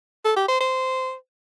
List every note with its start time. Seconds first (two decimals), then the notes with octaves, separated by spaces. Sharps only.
0.25 A4
0.37 G4
0.49 C5
0.61 C5